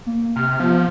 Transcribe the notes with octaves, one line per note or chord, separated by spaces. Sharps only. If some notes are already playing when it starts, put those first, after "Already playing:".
A#3
C3 F6
F3 B3